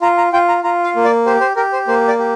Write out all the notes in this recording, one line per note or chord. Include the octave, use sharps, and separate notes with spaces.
F4 A#5
A#5
F4 G5
A#5
F4 A#5
F5
A#3
D5
G4 C5
C5
G4 A#4
C5
A#3 C5
D5
G4